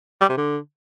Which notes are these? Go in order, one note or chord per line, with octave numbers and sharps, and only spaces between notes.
G3
C3
D3